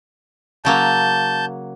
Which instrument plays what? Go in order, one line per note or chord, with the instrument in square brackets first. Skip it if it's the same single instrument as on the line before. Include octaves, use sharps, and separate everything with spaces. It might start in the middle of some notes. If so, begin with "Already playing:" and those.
[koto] C#3 F#3 A#3 [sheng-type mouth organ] A5 G6